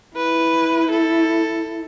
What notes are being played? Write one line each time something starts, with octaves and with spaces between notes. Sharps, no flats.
E4 B4
A4